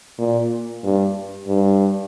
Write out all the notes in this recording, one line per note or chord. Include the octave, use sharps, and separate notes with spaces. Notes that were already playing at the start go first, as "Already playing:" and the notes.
A#2
G2
G2